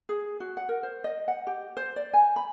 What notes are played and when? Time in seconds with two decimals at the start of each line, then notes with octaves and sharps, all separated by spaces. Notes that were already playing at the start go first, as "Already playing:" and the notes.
0.09 G#4
0.40 F#4
0.57 F#5
0.69 A#4
0.83 C5
1.04 D#5
1.28 F#5
1.47 G4
1.77 C5
1.96 D5
2.13 G#5
2.36 B5